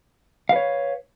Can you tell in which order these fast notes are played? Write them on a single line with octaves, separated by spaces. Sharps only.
F5 B4 C#5